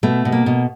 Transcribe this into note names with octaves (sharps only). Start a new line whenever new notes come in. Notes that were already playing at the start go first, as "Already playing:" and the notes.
B2 A3
B2
A#3
B2